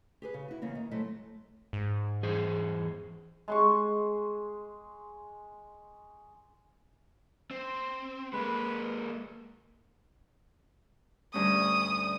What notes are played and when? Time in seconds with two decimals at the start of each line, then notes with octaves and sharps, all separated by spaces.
0.22 G4 G#4 B4
0.34 C#3
0.49 E4 F#4
0.62 E2 C#3 A#3
0.75 D#3
0.91 C3 F#3 G#3 A3 E4
1.73 G#2
2.23 E2 G#4 C5
3.48 G#3 C6 C#6
7.51 C4
8.33 G#3 A#3 B4
11.34 D2 G2 C#4 D#6